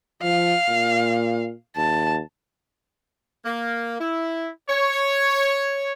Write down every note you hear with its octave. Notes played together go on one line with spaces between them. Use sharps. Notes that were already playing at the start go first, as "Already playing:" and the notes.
F3 F5
A#2
D#2 A5
A#3
E4
C#5